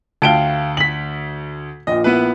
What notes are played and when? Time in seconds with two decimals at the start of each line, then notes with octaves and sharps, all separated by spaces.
0.22 D2 F5 G5 A5 D7 G7
0.77 B6 F#7
1.87 A#1 A#2 D#5
2.04 B3 E4 B4